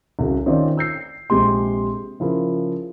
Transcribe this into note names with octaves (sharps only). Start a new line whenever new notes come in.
C2 C#3 F#4
D#3 C4 C#4 F4 C5 D5
E6 G6 C7
A#1 C3 G#3 G4 C6
C#3 F3 E4 A#4